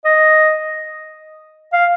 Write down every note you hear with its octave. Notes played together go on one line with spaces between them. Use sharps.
D#5
F5